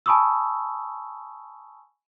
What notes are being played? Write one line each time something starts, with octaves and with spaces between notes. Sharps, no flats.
G#5 A5 B5 C#6 D#6 E6